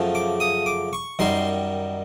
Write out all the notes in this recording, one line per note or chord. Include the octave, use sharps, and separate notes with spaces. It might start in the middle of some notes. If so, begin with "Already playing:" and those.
Already playing: F#2 C#3 F3 A3
D6
D#6
D6
C#6
F#2 D#3 G3 C6